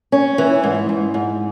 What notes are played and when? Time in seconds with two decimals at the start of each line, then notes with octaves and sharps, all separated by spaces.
0.12 C#4
0.38 E3
0.64 G#2
0.89 G#2
1.14 G#2